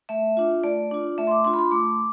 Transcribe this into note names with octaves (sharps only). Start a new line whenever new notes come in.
A3 E5
D4 F4
A3 D5
D4 F4
A3 E5
C6
D6
D4 F4 C6
B5
C6
A3 D6